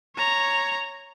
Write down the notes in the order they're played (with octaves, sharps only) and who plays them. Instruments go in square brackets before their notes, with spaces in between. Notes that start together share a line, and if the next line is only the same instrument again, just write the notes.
[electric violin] C#5 A#5